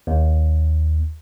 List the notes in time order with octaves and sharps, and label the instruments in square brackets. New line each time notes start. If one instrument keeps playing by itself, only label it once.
[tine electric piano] D#2